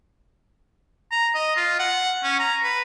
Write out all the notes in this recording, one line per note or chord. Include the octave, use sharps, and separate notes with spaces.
A#5
D#5
F4
F#5
C#4
A#5
B4